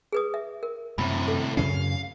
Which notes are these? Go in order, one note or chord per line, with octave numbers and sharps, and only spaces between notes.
G#4 B4 D#6
E5
A#4
F#2 A2 C3 B5
A4
F#2 C#3 C#4 F5